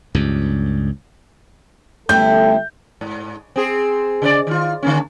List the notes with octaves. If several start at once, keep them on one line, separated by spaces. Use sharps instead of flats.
C#2 G2
G1 A3 C#4 E4 A4 G5 G6
G#2
C4 G#4
C#3 B4 D5
D#3 F4
D3 A#3 C#4